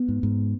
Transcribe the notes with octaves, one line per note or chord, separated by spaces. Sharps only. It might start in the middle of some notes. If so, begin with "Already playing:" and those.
Already playing: B3
G#2
G#2